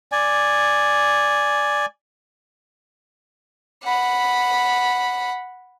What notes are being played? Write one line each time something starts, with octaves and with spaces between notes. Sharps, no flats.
D5 G#5
F#5 B5